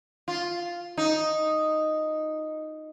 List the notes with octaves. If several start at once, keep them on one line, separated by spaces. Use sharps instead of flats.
F4
D#4